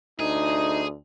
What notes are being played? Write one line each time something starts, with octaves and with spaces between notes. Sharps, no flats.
D2 D#4 G#4